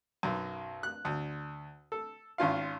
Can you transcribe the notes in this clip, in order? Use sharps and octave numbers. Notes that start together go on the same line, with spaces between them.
B1 F#2
F#6
D2
A4
G#1 C#4 F4 F5